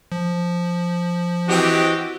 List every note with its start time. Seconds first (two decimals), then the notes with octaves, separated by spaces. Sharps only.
0.12 F3
1.48 E3 C4 F#4 G4 D#5